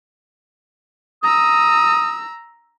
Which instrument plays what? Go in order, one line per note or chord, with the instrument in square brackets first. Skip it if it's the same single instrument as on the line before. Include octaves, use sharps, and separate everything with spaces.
[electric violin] A#5 E6 [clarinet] D#6